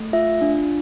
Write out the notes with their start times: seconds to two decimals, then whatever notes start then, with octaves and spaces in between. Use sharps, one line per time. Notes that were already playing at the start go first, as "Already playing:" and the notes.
Already playing: A3
0.13 F4 E5
0.41 D4